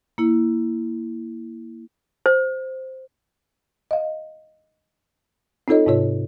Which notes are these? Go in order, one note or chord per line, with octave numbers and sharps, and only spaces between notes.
A#3 E4
C5
D#5 F5
C4 D#4 F4 A4 C#5 D#5
G#2 C3 F4 C#5